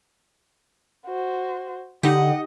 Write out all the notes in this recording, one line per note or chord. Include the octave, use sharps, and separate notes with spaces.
F#4 C5
D3 D#4 G4 D#5 F#5